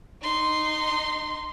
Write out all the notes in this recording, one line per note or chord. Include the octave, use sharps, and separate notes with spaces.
D#4 C6